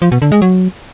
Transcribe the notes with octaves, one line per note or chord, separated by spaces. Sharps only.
F3
B2
D3
G#3
F#3